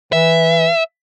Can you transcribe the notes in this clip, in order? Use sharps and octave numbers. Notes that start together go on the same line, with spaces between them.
E3 E5